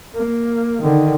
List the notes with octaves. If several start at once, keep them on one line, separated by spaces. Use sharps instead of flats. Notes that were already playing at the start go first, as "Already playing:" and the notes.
A#3
D3 D#3